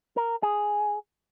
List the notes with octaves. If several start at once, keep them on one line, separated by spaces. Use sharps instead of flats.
A#4
G#4